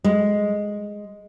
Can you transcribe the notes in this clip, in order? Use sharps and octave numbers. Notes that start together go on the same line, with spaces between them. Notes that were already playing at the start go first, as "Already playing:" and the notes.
G#3